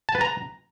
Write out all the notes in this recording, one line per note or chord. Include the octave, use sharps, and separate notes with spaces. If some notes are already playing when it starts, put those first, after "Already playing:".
A5
B4
A#5